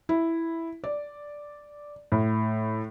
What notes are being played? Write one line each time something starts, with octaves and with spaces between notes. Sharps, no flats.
E4
D5
A2